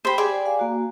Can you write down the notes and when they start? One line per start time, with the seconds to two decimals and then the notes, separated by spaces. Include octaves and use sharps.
0.05 G4 C5 G5 B5
0.18 G#4 D5
0.45 F5 G#5
0.59 A#3 F#4